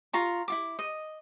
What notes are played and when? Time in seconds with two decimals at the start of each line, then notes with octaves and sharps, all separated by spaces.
0.13 F4 A#5 C#6
0.48 E4 F4 D6
0.79 D#5